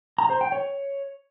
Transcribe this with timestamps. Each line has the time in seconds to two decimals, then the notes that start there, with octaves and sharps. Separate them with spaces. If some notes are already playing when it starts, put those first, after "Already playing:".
0.18 A#5
0.30 C5
0.41 G5
0.52 C#5